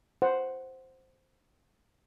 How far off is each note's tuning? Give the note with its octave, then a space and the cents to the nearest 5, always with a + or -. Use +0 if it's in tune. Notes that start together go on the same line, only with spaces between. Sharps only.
C5 +0 F#5 +0